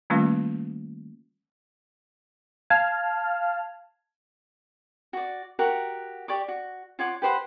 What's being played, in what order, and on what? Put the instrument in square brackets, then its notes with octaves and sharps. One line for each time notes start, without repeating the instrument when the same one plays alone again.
[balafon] D#3 G3 A3 A#3 C#4 F4
[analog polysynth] F5 A5 F6 [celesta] G#6
[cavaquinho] F#4 D5
F#4 G4 A#4 F#5
G4 D5 C#6 D6
F#4
F4 C#5 F#5 D6
G4 B4 C5 F#5